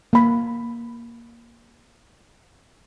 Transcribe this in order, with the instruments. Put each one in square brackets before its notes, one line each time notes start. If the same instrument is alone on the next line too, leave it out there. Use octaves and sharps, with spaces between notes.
[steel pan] A#3 B5